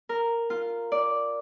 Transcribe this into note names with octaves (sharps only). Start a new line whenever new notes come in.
A#4
F4
D5